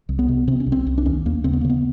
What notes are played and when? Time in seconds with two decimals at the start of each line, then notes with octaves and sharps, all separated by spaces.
0.09 C2
0.19 B3
0.28 C3
0.47 C3 C4
0.60 C#4
0.67 C2
0.72 C4
0.87 C2
0.98 D4
1.06 D#2 C#4
1.25 D#2 A#3
1.44 C#3 C4
1.53 B3
1.61 A#3
1.64 C#3
1.70 B3